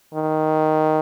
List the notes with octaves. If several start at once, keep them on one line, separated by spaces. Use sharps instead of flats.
D#3